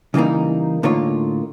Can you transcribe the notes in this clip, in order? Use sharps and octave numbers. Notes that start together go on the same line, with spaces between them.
C#3 E3 G3 A#3 D#4
A2 D3 A#3 D#4 F4 C#5